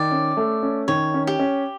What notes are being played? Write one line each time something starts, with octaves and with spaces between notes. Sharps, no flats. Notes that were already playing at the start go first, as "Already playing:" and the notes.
Already playing: D#3 D5
C#4
A3
C#4
D#3 C#5
C#4
G4
C#4